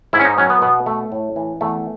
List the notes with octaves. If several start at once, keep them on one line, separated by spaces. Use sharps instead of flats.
G#2 E4
C#4
D#4
F#3 C#4
B3
B2 B3
A3
A2
E3
E2 A3